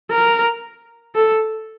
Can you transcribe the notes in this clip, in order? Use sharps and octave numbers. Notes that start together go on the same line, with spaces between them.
A#4
A4